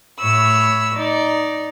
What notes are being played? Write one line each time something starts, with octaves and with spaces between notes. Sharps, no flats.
A2 C#5 B5 E6
D#4 D5